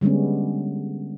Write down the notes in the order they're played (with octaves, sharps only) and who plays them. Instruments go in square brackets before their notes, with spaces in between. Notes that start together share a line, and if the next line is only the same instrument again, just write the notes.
[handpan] D3 G3 G#3 B3 C#4